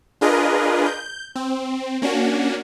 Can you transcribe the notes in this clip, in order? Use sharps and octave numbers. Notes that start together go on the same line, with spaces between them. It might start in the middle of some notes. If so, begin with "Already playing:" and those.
D4 F4 G#4 A#4 B4 D#5
G6
C4
A#3 C#4 D4 F#4